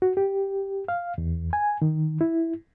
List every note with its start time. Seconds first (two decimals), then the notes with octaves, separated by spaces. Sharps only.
0.02 F#4
0.17 G4
0.88 F5
1.18 E2
1.53 G#5
1.82 D#3
2.21 E4